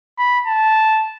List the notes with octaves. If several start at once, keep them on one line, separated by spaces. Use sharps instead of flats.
B5
A5